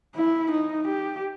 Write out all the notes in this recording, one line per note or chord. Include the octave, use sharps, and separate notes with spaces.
E4
D#4
G4